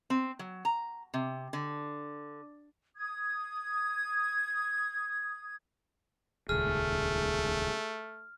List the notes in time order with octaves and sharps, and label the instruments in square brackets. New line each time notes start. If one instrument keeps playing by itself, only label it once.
[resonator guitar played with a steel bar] C4
F#3
A#5
C3
D3
[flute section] D#6 G#6
[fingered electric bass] D#1 C#2 [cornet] A3 [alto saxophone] G#4 [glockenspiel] F6